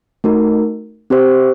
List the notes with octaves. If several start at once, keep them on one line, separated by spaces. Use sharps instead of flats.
A3 D#4 F#4 A#4
C4 G4 C5